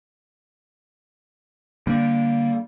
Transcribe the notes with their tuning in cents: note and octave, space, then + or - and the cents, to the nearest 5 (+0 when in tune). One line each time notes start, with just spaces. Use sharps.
D3 -15 G3 +0 A#3 +0